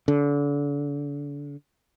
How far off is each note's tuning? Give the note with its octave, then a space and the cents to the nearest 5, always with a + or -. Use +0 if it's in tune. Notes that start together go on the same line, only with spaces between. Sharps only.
D3 -35